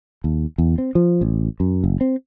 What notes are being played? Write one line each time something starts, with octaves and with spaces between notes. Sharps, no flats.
D#2
E2
C4
F3
A1
F#2
F#1
C4